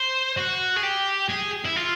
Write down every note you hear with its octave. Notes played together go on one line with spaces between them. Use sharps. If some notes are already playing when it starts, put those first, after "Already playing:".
Already playing: C5
F#4
G#4
G4
G#4
E4
F4